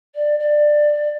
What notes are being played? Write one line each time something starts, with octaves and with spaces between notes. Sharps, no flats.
D5
D5